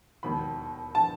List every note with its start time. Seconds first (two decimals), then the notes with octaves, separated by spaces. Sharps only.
0.23 E1 D#2 D#3 B5
0.95 A5